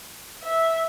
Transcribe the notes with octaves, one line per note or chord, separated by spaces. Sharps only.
E5